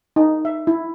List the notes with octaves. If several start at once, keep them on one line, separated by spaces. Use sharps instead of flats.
D#4
E5
E4